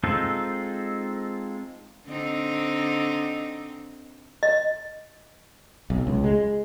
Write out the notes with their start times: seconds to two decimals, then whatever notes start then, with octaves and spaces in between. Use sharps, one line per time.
0.03 G#3 C4 D#4 F4 A4
2.07 D3 C4 D#4
4.43 D#5
5.90 B1
6.07 C#2
6.24 G#3